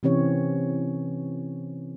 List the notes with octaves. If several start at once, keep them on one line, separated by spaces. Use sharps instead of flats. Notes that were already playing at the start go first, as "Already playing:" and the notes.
C3 E3 C4 C#4 G4 C#5